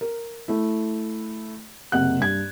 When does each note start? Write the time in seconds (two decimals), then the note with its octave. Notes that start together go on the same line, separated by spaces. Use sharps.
0.01 A#4
0.48 A3 E4
1.92 F#1 C3 F#5 F#6
2.20 G2 G#6